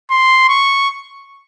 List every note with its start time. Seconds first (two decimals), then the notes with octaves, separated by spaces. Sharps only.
0.11 C6
0.49 C#6